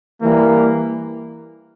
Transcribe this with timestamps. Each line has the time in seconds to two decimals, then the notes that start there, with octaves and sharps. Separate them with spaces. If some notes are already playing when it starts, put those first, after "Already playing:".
0.22 E3 G3 A#3